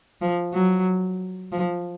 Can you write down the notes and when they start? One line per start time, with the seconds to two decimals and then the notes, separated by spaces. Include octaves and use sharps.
0.21 F3
0.53 F#3
1.52 F3